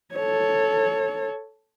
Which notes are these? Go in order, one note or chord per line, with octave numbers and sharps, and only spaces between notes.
A4 C#5